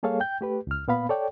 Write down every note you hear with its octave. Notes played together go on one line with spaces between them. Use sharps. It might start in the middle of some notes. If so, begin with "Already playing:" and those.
G3 A#3 G#4 A4 C#5 F5
G5 G6
A3 G4 B4
C#2 F6
A#2 B3 F5 B5
A4 C#5 D5 G5